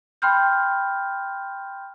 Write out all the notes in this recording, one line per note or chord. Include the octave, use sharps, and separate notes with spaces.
G5 B5 C6 F6 G6